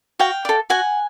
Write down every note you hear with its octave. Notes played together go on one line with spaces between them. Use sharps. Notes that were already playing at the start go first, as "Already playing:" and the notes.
F#4 F5 G5
A4 D5
F#4 F#5 G#5